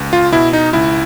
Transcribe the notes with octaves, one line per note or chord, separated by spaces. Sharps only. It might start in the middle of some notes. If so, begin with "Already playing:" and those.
Already playing: C#2
F4
B2 E4
D#4
C#2 E4